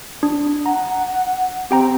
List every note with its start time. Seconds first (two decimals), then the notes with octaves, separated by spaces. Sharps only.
0.23 D4
0.66 F#5 A#5
1.71 C4 G4 G5 A#5